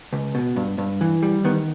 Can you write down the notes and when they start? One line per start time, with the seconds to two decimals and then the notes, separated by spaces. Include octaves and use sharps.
0.13 C#2
0.35 B2
0.56 G2
0.78 G2
1.01 E3
1.23 G3
1.44 D#3 B3